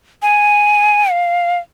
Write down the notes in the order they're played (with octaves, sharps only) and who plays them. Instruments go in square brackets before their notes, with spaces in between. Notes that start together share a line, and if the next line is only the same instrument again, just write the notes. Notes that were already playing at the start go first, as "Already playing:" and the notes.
[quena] G#5
F5